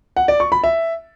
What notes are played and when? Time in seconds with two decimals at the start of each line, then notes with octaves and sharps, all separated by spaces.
0.17 F#5
0.28 D5
0.40 C#6
0.52 B5
0.64 E5